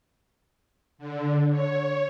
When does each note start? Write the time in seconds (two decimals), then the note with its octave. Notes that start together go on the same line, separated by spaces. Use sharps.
0.98 D3
1.50 C#5